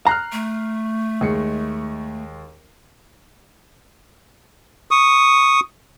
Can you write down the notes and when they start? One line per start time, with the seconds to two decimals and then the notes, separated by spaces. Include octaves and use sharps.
0.07 A#5 F6 F#6 C7
0.32 A3
1.21 D#2 G#3 C#7
4.91 C#6 D#6